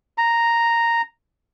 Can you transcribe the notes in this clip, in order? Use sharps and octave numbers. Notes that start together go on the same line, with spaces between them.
A#5